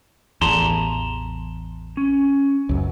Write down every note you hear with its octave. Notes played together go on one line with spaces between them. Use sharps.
A1 E2 A5 A#5 C6
C#4
C#2 F#2